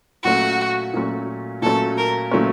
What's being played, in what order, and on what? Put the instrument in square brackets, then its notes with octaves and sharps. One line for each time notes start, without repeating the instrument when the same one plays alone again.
[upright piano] A#2 F#3 A3 C#4 [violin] F#4
[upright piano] A#2 F#3 A3 C#4
[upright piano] A#2 F#3 A3 C#4 [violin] A4
[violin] A#4
[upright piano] A#2 F#3 A3 C#4